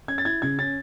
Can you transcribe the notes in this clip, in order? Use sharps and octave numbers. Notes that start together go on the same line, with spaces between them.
C#4 G#6
A6
E4 G#6
C#3 G#6
C#4 A6